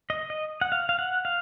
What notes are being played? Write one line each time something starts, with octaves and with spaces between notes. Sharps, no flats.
D#5
D#5
F#5
F5
F5
F#5
F5